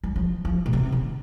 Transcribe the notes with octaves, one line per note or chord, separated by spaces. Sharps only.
G3
F3
F3
A#2
C3
D3